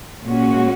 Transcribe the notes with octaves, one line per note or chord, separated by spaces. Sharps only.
A#2 G#3 C#4 F#4